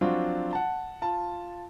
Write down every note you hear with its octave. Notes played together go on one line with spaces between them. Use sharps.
F3 F#3 C4 D4 F4 F#4
F#5 A5
F4 A5